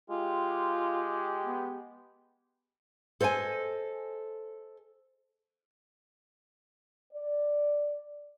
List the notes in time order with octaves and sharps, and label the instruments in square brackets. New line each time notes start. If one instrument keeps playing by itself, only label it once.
[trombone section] G#3 G4 [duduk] F4
[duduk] B3
[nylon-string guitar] A4 C5 D#5 F#5 G#5
[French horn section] D5